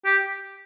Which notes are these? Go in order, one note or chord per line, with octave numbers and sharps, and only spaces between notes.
G4